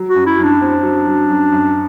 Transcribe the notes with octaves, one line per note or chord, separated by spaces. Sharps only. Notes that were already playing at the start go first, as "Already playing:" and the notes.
Already playing: F#3
F#4
F#2
E4
F#2
D4
C4
F#3
F#3
F#2
F#2